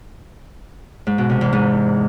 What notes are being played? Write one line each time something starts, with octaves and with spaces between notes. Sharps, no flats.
G#2
B2
C3
E2
G#2